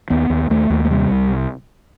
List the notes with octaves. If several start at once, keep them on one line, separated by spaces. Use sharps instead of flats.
D#2 B3
D#2
D#2 A3
D#2
A3
C3 G3
C2